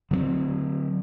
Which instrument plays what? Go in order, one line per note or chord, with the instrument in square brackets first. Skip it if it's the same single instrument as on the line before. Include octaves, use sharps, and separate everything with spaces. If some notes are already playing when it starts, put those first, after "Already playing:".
[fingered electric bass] D3 F#3 A3 C4